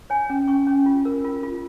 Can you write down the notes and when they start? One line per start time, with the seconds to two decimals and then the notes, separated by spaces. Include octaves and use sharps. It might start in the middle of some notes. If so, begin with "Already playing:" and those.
0.10 C#5 G#5
0.30 C#4
0.48 C#4 C#6
0.67 C#4
0.86 F4
1.05 A#4
1.24 F4
1.43 F4